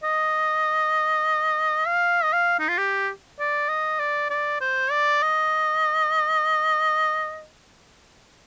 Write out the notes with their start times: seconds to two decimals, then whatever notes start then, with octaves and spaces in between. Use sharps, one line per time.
0.04 D#5
1.87 F5
2.23 D#5
2.33 F5
2.59 D#4
2.68 F4
2.78 G4
3.39 D5
3.69 D#5
3.99 D5
4.30 D5
4.60 C5
4.91 D5
5.22 D#5